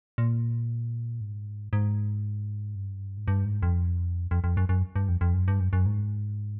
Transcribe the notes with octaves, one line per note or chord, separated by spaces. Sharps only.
A#2
G#2
G#2
G2
G#2
G2
G#2
F2
F2
F2
F#2
F#2
G2
F2
F2
F#2
G2
F#2
F#2
G#2